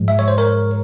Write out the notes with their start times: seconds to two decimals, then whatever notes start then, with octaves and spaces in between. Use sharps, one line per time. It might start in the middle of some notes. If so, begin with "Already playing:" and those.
Already playing: G#2 F3 G#3
0.08 E5
0.19 C#5
0.28 C5
0.38 A#4 C#5